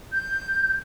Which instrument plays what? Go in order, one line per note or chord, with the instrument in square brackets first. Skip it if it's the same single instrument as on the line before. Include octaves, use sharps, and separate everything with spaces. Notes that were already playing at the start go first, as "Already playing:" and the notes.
[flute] G6